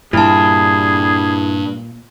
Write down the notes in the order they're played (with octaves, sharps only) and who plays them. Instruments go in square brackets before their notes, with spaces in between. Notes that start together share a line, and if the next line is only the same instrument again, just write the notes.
[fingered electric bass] G2 [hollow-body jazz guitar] A#2 [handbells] E4 A5 [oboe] G#4